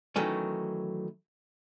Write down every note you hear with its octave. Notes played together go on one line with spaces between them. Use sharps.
D#3 E3 F#3 A3 C#4